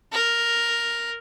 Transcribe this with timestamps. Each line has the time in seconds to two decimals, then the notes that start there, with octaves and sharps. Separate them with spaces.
0.13 A#4